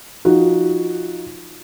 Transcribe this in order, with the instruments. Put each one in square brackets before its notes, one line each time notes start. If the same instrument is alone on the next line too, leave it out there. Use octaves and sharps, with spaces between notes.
[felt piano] F3 D#4 F#4